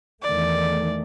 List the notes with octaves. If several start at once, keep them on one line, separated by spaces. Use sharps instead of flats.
E2 D#3 A3 D5